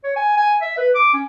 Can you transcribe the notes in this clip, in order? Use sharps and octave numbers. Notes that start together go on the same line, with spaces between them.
C#5
G#5
G#5
E5
B4
D6
C#4